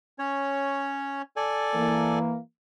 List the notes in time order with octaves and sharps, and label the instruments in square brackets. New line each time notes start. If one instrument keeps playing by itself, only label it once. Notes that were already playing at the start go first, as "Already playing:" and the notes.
[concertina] C#4 C#5
A4 D5 G#5
[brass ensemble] E3 A#3